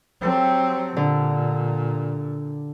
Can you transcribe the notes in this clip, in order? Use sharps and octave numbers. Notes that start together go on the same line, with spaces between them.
F#3 C4 G4 A4 G5
A#2 D3